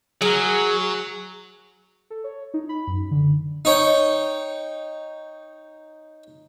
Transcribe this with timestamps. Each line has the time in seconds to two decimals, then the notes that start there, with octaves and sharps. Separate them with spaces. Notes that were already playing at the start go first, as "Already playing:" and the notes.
0.22 F#3 G#4 A#4
2.10 A4
2.24 C#5
2.54 D#4
2.69 B5
2.87 F#2
3.11 D3
3.65 D#4 C#5 G5